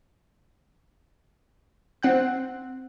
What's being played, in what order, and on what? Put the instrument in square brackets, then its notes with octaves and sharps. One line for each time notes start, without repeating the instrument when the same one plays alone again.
[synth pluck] C4 F#5 F#6